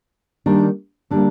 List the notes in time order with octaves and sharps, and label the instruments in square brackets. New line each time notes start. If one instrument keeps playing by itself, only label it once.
[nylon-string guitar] D#3 G3 A#3 D4
D3 G3 A#3 D4